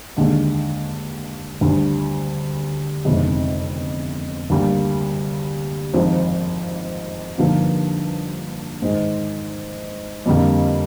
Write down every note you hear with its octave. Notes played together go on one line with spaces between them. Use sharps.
D#2 D3 G#3
D2 D3 G3
G1 F2 C3 D#3 G#3
D2 D3 G3 A#3
G#1 G#2 F3 C4 D#4
G2 D3 F3 A#3 D#4
G#2 D#3 G#3
F2 D3 G3 A#3